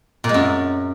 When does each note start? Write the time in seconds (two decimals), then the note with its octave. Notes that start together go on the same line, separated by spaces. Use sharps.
0.24 A#2
0.29 G#3
0.34 F#2